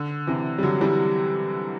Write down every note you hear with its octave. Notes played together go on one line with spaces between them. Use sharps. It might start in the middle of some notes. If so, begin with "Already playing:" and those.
Already playing: D3
C3 E3
G3
D3 F#3
E3 G3